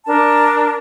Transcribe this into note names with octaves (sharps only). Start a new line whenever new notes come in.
D4 A#4 A5